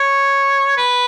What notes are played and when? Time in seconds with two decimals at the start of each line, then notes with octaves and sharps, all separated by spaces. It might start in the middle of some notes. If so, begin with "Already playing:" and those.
Already playing: C#5
0.77 B4